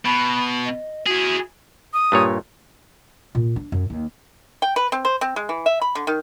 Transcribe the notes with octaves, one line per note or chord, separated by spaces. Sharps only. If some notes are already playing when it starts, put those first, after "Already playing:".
B2 B5
D#5
E4 F#4 G#4
D#6
G2 A#2 C#5
A#2
D4
F#2
D#2
G5
B4
C4
C5
C4
G#3
E3
E5
B5
D3
D#3